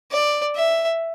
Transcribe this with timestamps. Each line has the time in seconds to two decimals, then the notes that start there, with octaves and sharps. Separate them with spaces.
0.11 D5
0.55 E5